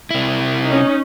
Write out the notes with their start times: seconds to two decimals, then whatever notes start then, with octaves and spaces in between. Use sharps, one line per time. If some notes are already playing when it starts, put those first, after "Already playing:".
0.11 C3 E4
0.66 C#4 D#4